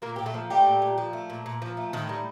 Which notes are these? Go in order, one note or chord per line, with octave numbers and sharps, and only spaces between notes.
A#2 A#3 A#4
A#2 G4
A3 A4
F3
G3 A3 G4
A#2
A#2
F3
A3
A#2
A#2
F3
A3
A2 D#3 D#4
G3